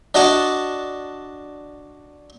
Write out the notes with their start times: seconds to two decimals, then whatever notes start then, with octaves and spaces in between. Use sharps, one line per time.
0.15 D4 F#4 D#5 F#5 A5